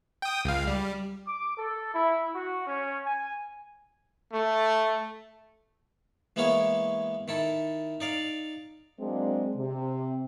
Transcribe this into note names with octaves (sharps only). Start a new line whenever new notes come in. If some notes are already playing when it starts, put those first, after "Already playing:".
G5 D#6
C#2 F5
G3
D6
A4
E4
F#4
C#4
G#5
A3
E3 G#3 A#3 B3 E4 C#5
D#3 E4 A4
D#4 D5 F5
F#3 G#3 A#3 C4 D4
C3